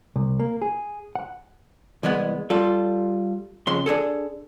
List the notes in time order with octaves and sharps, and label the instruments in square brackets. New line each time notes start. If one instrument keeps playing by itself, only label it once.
[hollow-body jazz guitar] C2
A#3
G#4
F#5
C2 E3 G#3 B3
G3 F4 A4
F2 C#3 C6
D4 D#4 G#4 A4